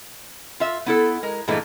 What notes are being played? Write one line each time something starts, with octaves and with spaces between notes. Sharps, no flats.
F4 E5
B3 E4 A4
G#3 A#4
G2 A#2 E3 G#3 A3